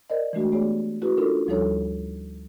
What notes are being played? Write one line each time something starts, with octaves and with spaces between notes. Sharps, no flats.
A#4 C5 D5 D#5
E3 G#3 A3 D4 F#4
A3 B3 G4 G#4 C#5 D5
C#4 E4 F#4 G#4 B4
C#4 D4 F4 A4 A#4
D2 F3 G3 D#4 A4 C#5